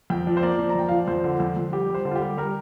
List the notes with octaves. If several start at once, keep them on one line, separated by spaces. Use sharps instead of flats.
F2 G5
F3 D5
C5
A#3 D5
F3
A#5
F2 G5
F3 F5
D5
F2 C5
D3
F2
F2
G3 G4
G3 C5
D3
F4
G4
G3
G3 A#4